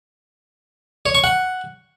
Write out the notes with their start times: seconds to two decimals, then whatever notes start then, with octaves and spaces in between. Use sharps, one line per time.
1.06 C#5
1.15 C#6
1.24 F#5